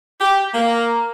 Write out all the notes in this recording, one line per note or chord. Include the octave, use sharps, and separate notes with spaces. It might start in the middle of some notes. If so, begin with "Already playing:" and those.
G4
A#3